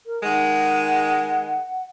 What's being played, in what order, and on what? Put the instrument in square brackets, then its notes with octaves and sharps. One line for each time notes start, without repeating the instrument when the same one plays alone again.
[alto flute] A#4
[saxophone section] D#3 G#3 [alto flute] F#5